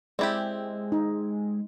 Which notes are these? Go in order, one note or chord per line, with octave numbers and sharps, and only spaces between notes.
G#3 C4 E4 G4 D5
D#4